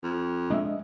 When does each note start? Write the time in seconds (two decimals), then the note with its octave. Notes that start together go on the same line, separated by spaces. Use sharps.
0.04 F2
0.50 G#3 D4 D#5 E5